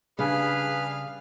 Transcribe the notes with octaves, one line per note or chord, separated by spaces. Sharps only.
C#3 G3 D4 G#4 B4 F5